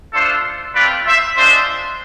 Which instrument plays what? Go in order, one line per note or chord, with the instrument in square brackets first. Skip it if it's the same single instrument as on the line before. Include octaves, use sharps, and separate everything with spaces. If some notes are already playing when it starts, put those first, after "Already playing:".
[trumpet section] A3 D4 F4 A4 C5
A3 C4 F4 B4 D5
C5 E5
G#3 D4 F4 C5 E5